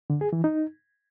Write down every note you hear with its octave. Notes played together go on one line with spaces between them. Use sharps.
D3
G#4
E3
D#4